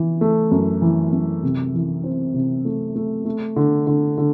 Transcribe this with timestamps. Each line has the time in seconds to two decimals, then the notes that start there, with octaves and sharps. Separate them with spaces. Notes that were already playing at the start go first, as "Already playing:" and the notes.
Already playing: E3
0.21 A3
0.51 F#2
0.82 E3
1.13 F#2
1.43 C3
1.74 E3
2.04 C4
2.34 C3
2.65 A3
2.96 A3
3.25 A3
3.56 D3
3.87 D3
4.18 D3